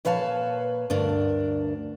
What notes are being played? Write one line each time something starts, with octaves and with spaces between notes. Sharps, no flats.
A#2 B4 C#5 F5 A5
D2 G2 D4 A#4